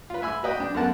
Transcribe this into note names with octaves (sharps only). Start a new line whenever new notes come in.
F4 B4
E5 G#5 B5 E6
F#4 B4 D#5 G5
D4 G5
F#2 A3 B3 A#4 F#5 A5